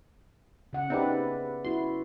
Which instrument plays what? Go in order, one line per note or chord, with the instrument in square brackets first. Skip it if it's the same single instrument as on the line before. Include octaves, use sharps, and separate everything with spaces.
[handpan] C#3 F#5
[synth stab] C4 D#4 G4 [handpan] B4 D5 E5
[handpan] E4 F#4 [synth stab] C6